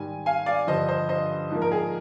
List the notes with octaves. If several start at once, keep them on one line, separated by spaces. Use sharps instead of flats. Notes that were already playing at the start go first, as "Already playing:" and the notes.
Already playing: G#2 D#3 G3 G#5
F5 G#5
D5 F5
G2 D3 F3 C5 D#5
C5 D#5
C5 D#5
G#2 F3 A#3
A#4
G#4